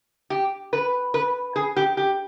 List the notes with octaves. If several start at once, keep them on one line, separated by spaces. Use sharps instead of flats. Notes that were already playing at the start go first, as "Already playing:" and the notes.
G4
B4
B4
G#4
G4
G4